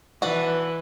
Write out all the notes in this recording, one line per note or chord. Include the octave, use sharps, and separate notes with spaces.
E3 B3 D4 F#4 B4